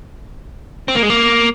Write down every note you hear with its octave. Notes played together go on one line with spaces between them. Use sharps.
C4
A#3
G#3
A#3